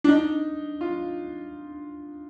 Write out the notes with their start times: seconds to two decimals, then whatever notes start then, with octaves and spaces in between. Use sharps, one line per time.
0.04 D4
0.09 D#4
0.81 F4